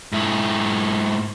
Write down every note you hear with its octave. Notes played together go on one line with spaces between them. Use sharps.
G#2 E4